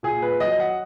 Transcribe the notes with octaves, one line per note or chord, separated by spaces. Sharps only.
A#2 G#4
B4
F#3 D#5
F#5